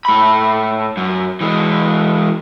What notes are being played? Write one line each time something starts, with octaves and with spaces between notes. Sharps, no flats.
A2 B5
F#2
E3 G#3